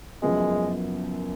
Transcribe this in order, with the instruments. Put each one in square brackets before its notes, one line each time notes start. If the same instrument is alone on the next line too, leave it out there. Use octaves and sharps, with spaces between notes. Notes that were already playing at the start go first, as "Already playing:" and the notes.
[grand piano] F#1 F#2 F3 B3 [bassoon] G#3